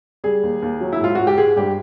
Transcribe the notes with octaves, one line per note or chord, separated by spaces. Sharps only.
G3 G#4
D#2
D#2
F#3
E4
G#2 F4
G#2 F#4
G4
G#3 G#4
G2 G4